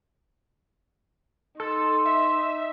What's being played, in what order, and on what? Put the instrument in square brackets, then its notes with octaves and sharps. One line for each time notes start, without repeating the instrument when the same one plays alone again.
[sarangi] D#4 [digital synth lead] A4 [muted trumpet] C6
[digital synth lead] E5